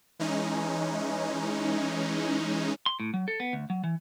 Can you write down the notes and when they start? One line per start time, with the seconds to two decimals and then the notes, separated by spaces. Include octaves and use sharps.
0.19 E3 G#3 C#4 D#4
2.86 C6
3.00 A2
3.14 F#3
3.28 A4
3.40 B3
3.53 D2
3.70 F#3
3.84 E3